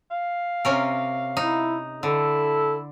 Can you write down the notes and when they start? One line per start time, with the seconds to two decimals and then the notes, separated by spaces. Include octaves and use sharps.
0.11 F5
0.65 C3 C#4 A#4
1.37 D#4 E4
2.03 D3 E4 A4